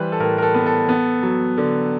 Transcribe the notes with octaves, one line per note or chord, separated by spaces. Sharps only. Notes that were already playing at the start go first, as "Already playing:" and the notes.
Already playing: E3 G3 B4 C5
A4
A2 A#4
A#4
A4
B3
A4
B3
F#3
D3